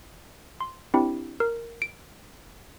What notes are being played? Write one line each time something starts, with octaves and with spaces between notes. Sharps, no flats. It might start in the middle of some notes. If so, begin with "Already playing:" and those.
C6
C4 D4 E4 G4
A#4
D7